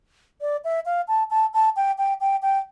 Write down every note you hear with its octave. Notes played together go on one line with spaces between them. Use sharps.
D5
E5
F5
A5
A5
A5
G5
G5
G5
G5